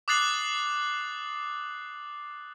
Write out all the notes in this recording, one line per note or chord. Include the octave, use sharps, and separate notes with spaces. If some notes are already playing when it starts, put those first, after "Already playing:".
D6 D#6 F#6 A6 C7 F#7